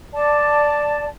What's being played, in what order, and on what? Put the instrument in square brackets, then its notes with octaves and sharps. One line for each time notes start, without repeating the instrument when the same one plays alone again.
[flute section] D5 A5